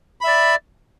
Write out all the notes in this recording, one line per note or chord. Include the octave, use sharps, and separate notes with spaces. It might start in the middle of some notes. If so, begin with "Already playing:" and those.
D5 E5 B5